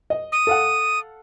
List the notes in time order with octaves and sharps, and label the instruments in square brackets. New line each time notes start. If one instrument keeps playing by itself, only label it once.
[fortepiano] D#5
[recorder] D#6
[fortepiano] A4 F5 F#5